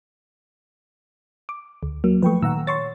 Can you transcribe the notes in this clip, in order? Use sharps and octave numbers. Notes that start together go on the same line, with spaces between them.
D6
D2
F#3 A#3
F3 A3 B4 G5 C#6
A#2 D#3 F#5 A#5 E6
C#5 C6 C#6 A6